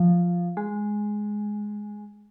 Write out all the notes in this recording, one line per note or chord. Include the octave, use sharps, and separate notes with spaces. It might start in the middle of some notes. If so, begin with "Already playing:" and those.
Already playing: F3
G#3